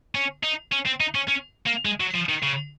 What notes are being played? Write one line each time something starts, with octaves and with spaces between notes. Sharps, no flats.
C#4
D#4
C#4
C4
D#4
C#4
C#4
A#3
G#3
F#3
F3
D#3
C#3